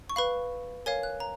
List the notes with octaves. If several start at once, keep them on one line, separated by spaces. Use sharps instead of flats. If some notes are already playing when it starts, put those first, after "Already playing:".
C#6
B4 F5 B5
A#4 C#5 F5 G#5
F#6
A#5